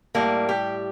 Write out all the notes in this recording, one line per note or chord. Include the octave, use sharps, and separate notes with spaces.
A2 G3 A#3
G4